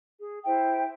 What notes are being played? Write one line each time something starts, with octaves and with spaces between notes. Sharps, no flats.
G#4
E4 C5 E5 G5